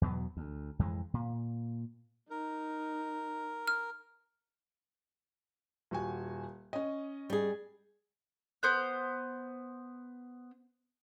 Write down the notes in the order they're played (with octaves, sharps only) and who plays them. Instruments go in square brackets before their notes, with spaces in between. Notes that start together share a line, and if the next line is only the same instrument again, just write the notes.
[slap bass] E2 B2 F#3 B3
D2
F2 E3 G#3
A#2
[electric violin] D#4 [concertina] A#4
[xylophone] F6
[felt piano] D#1 F#4 G#5
C#4 D#5
[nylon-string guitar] G3 G#4
[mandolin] B3 C5 F#6